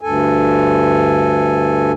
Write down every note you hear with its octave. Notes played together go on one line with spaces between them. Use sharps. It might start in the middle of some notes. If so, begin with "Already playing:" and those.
D2 G2 A4 G#5